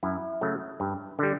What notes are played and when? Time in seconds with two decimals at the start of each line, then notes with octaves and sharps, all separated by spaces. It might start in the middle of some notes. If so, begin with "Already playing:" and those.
0.03 F#2 E4
0.41 C#3 F#3 A3
0.80 G2
1.19 D3 G3